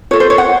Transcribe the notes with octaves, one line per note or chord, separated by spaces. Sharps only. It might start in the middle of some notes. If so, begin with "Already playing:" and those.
F4 A4 C#5
C5
C#5
F#5